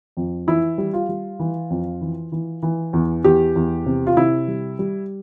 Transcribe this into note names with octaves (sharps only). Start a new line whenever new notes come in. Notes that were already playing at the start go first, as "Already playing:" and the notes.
F2
E3 E4
G3
F4
G3
E3
F2
E3
E3
E3
E2
E2 G4
E2
C3
F4
C3 E4
G3
G3